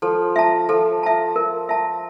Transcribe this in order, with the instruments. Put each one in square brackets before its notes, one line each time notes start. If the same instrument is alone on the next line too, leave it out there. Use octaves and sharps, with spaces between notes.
[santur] F3 [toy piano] A4
[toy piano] E5 A5
[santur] F3 [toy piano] A4
[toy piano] E5 A5
A#4
E5 A5